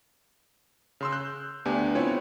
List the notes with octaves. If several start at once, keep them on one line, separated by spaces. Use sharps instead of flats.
C#3 C6 E6
F#6 G6
D2 B3 D4 G4 G#5
B3 C4 E4 F4 C#5 G#5